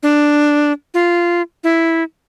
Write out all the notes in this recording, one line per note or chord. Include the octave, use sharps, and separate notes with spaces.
D4
F4
E4